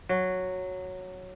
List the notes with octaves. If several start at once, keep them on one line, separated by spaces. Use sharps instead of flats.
F#3